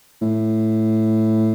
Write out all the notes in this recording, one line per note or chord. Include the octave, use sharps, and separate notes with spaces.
A2